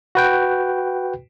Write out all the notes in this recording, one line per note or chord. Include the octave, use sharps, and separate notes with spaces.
F#4 B4 G5